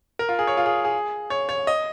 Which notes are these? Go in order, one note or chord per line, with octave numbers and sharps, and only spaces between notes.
A#4
F4
G#4
C#5
F4
G#4
G#4
C#5
C#5
D#5